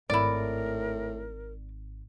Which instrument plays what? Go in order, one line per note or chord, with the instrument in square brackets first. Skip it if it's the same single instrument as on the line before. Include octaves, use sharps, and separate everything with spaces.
[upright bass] G#1 [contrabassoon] A2 [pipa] E4 D5 [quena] A#4